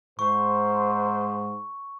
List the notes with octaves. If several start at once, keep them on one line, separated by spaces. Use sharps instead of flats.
G#2 C5 C#6